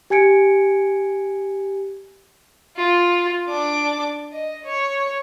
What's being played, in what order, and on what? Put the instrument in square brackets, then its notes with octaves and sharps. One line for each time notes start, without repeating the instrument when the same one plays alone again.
[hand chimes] G4 G#5 G#6 C#7 D7
[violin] F4
D4 D6
D#5
C#5